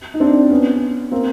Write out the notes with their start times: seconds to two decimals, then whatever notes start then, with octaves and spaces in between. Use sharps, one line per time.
0.14 D#4
0.20 C4 D4
0.50 B3 C#4
1.11 A#3 C4